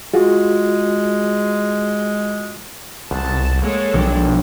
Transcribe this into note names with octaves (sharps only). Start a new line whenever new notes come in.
G#3 F4 F#4 G#4
C2 F#5 A5 C6
G#3 A#3 A4 C#5
B1 F3 G3 D4